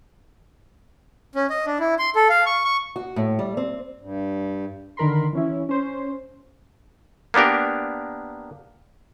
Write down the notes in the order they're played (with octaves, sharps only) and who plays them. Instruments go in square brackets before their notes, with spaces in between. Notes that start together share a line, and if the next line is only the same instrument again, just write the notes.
[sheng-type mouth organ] C#4
D#5
D4
E4
C6
A4
F5
C#6
C#6
[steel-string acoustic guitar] F#4
A2
G3
C4
[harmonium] G2
[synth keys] D3 D#3 A#4 B5 C6
E3 C#4 E4
C#4 C5
[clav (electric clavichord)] A#3 B3 D4 G4 A#4